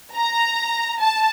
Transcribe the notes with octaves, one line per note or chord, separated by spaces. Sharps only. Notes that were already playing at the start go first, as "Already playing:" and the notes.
A#5
A5